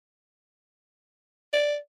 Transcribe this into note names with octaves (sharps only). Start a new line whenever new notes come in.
D5